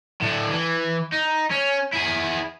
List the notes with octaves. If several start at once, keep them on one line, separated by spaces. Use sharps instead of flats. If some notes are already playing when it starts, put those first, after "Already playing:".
A2 D4
E3
D#4
C#4
E4 G#4